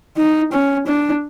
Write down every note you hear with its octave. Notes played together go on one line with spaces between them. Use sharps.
D#4
C#4
D4